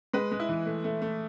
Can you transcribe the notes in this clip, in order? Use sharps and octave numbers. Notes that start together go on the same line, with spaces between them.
G#3 B4
G#3
E4
E3
A3
A3
A3